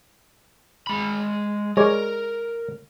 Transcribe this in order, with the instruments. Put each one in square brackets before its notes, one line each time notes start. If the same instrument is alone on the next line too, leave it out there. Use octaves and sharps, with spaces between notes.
[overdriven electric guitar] G#3 B5
[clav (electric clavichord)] G#3 C#5 D5 [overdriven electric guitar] A#4